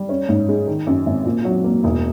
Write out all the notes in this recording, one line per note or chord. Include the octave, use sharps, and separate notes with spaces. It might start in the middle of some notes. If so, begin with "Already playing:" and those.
Already playing: G3
C#4
G#2
G#3
D#3
F#2
G#1
A#2
F#3
A#3
E1